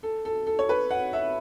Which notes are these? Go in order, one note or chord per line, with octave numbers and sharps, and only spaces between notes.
A4
A4
A4
C#5
B4
F#5
E5